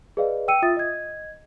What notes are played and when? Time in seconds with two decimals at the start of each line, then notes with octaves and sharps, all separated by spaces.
0.17 G#4 B4 D5 D#5 F5
0.48 G5 E6 C#7 D#7
0.62 F4 E5 D#6 A6
0.77 D#5 G#6